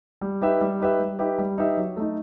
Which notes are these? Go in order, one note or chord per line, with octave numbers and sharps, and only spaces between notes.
G3
D#4 G4 B4 E5
G3
D#4 G4 B4 E5
G3
D#4 G4 B4 E5
G3
D#4 G4 B4 E5
F#3
A3 D#4